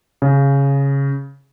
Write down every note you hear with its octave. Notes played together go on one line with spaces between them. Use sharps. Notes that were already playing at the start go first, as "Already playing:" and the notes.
C#3